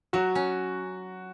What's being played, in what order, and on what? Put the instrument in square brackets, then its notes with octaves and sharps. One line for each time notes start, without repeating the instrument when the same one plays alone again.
[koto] F#3 [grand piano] F#4
[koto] C#4